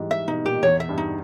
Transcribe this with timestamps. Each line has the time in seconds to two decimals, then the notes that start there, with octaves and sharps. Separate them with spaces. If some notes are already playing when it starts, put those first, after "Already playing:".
Already playing: G#2 E3 G3
0.11 E5
0.28 B2 D#4
0.45 A#2 G4
0.62 E2 C#5
0.80 E5
0.89 G2
0.98 D#4